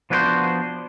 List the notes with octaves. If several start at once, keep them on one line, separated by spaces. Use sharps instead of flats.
F3 B3 D4 E4 F#4 C5